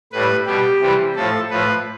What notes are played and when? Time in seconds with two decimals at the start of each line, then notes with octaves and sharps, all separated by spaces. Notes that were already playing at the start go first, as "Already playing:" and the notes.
0.12 A2 G3 B4
0.46 B2 G3 G4
0.81 C3 E3 G3
1.16 A2 F3 A4
1.50 A2 F3 B4